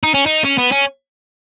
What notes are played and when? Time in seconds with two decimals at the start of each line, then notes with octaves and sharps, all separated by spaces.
0.03 D#4
0.14 C#4
0.26 D#4
0.45 C#4
0.58 B3
0.72 C#4